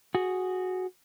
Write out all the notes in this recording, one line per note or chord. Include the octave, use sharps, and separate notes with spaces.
F#4 G#4